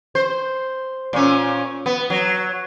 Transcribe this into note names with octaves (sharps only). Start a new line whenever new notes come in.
C5
A#2 C#4
B3
F#3